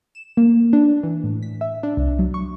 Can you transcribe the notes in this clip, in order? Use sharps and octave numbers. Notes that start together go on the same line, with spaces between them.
E7
A#3
D4
E3
A2
B6
E5
D4
C2
F#3
C#6